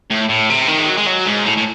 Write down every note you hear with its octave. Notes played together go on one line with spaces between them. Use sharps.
A2
A2
C3
D#3
G#3
F#3
G#3
F#3
G#2
A2
A2